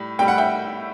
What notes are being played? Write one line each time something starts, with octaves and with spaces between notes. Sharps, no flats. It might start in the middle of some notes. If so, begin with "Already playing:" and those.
Already playing: A2 G3
A2 G3 G5
F#5
E5 G5